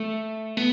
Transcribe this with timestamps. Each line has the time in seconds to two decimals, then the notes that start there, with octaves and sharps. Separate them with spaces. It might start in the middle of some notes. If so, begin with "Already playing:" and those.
Already playing: A3
0.57 B3